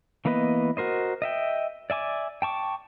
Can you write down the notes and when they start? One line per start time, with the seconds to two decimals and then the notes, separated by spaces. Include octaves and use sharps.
0.25 E3 A#3 B3 B4 D#5
0.77 F#4 A#4 C5 D#5
1.22 D#5 E5 G5
1.90 D5 E5 G#5 D6
2.42 G5 A5 C#6 D6